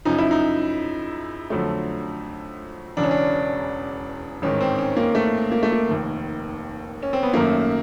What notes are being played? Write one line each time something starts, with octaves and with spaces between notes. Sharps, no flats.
F#2 C#3 F3 D#4
E4
D#4
F2 D3 F#3 A3
E1 E2 C#3 D4
C#4
D4
A1 G#2 D#3 C#4
C4
C#4
A#3
A3
A#3
A3
A#3
F1 D#2 D#3
C#4
C4
B3
G#1 F#2 D#3 F#3 A3 A#3